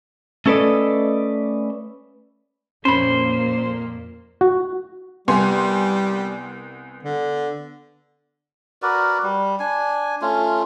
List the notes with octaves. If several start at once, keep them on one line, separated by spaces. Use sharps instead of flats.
A3 C#4 A4 B4 D5 D#5
F2 A#2 A#3 C#4 C5 B5
F#4
C2 G3 B3 G#5 C6
D3
F#4 A#4 B4 D5
G3
D4 G#5
A3 C#4 F4